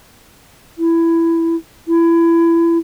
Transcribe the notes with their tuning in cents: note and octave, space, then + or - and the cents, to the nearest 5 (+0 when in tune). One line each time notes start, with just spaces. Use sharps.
E4 +10
E4 +25